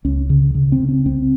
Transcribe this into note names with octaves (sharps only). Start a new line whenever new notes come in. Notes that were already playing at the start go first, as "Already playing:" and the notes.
C#2 C#4
C#3
C#3
C4
C#3
C#4
C2 C4